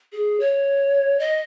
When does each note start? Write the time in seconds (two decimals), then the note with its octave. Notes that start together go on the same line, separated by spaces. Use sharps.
0.12 G#4
0.40 C#5
1.19 D#5